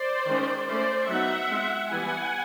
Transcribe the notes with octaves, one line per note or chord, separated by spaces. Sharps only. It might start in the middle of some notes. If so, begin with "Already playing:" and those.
Already playing: C5 D5
D#3 G#3 C#4
A3 C#4 E4 C5 D5
F#3 B3 D#4 E5 F#5
G#3 C4 F4
E3 G3 B3 E4 F#5 G#5